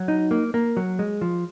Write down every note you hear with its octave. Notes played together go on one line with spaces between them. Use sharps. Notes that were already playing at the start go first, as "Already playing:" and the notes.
Already playing: F#3
D#4
A#3
A#3
F#3
G#3
F3